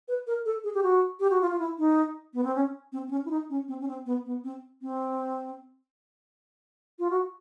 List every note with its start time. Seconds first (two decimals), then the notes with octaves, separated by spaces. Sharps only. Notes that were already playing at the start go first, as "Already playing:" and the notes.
0.08 B4
0.27 A#4
0.45 A4
0.64 G#4
0.74 G4
0.83 F#4
1.20 G4
1.30 F#4
1.41 F4
1.51 F4
1.59 E4
1.78 D#4
2.34 B3
2.43 C4
2.55 C#4
2.92 C4
3.07 C4
3.11 C#4
3.25 E4
3.30 D#4
3.50 C#4
3.68 C4
3.81 C#4
3.88 C4
4.06 B3
4.26 B3
4.44 C4
4.82 C4
6.99 F4
7.10 F#4